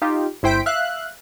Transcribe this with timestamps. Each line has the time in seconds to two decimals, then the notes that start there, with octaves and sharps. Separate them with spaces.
0.02 D#4 F4 G4
0.43 G1 E4 C5 G5 B6 D7
0.66 E5 F5 F#6